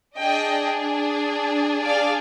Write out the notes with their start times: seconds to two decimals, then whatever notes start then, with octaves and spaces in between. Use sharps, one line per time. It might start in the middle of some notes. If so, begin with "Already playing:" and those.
0.18 D4 G#4 D#5 G5
1.85 D5 F5